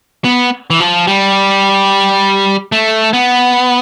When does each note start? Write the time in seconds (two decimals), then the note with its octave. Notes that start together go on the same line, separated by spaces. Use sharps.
0.24 B3
0.70 E3
0.80 F3
1.07 G3
2.72 A3
3.13 B3